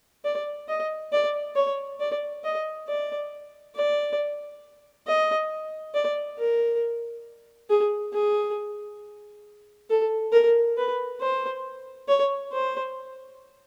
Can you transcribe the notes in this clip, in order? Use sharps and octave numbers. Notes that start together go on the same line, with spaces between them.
D5
D#5
D5
C#5
D5
D#5
D5
D5
D#5
D5
A#4
G#4
G#4
A4
A#4
B4
C5
C#5
C5